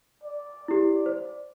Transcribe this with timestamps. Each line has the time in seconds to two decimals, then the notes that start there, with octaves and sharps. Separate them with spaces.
0.24 D5
0.68 E4 G4
1.06 C5